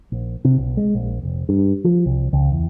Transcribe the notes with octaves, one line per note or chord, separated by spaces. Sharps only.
A#1
C3
B1
G#3
A#1
F1
G2
F3
C2
C#2
E2